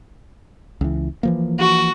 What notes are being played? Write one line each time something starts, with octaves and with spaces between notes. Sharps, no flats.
C#2 E3
E3 F3 A#3
F#4